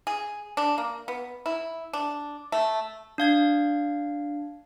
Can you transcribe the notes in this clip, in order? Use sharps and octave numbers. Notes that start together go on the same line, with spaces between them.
G#4
D4
A#3
B3
E4
D4
A3
D4 F5 G#6